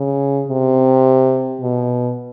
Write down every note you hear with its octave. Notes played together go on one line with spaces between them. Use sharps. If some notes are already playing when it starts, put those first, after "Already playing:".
Already playing: C#3
C3
B2